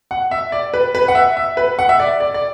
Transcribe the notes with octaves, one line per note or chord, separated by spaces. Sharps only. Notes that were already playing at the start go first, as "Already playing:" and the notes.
F#5
E5
D5
B4
B4
F#5
E5
E5
B4
F#5
E5
D5
D5
D5